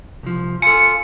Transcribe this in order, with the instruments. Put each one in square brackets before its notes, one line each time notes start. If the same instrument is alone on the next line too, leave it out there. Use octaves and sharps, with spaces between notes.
[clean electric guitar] C2 F3
[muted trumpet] F4 [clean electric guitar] A4 G#5 [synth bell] C#7